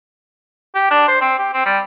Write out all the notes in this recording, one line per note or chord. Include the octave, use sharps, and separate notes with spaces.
G4
D4
C5
C4
G4
C4
G3